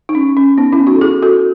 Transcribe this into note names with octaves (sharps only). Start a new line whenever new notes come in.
D#4
C#4
C#4
B3 D#4
C#4 E4
D#4 F#4
A4
E4 G#4
F#4 A4